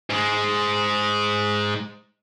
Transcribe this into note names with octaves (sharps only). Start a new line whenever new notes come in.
G#2 G#3